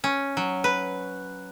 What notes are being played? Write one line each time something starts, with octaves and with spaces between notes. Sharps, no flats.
C#4
F#3
B4